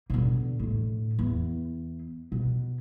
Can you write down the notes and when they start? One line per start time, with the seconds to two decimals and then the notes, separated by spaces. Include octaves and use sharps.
0.10 B2 D3
0.60 A2 D3
1.19 E2
2.32 B2